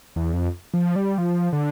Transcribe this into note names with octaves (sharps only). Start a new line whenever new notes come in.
E2
F2
F3
G3
F3
D3